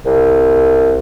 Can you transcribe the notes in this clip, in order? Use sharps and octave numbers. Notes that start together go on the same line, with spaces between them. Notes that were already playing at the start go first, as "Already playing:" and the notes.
C2